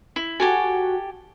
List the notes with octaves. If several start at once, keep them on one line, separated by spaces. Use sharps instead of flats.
E4
F#4 G4 A4 G#5